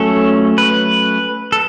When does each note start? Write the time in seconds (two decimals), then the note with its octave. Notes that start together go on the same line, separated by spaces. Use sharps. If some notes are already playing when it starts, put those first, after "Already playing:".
Already playing: F#3 A3 C#4 A4
0.58 B4
1.52 A4